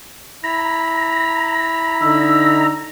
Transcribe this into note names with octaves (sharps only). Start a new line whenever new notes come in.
E4 A#5 B5
D3 D#4 E6